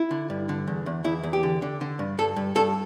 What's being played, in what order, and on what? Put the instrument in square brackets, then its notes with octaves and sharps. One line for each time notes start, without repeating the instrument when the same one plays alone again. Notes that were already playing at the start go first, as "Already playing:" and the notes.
Already playing: [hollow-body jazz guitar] E4
D3
G2
D3
E2
E2
E2 E4
E2
G4
D3
D3
D3
G2
G2 A4
G2
G2 A4